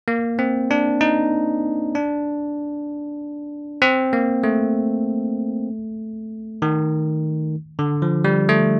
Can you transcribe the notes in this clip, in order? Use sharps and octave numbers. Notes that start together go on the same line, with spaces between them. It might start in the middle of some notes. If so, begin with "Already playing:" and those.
A#3
C4
D4
D#4
D4
C4
A#3
A3
D#3
D3
F3
G3
A3